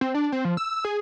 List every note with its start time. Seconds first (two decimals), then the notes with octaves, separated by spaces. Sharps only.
0.01 C4
0.14 D4
0.32 C4
0.45 F3
0.57 E6
0.85 G#4